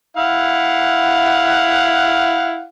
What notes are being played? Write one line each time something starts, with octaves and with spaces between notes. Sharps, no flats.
E4 F5 F#5